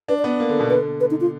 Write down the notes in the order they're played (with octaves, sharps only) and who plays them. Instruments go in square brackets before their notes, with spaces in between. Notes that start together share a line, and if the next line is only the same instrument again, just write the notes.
[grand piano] D4 [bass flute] B4
[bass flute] D5
[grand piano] B3
A#3
D3
B2
[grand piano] D3 [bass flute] B4
[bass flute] B4
D#4
F4